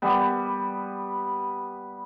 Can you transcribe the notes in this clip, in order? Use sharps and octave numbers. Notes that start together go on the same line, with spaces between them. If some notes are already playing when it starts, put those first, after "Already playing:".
G3 B3